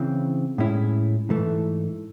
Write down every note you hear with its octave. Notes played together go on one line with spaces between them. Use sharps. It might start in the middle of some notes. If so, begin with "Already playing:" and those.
Already playing: C#3 E3 C4
A2 G#3 C#4 E4
G#2 E3 A3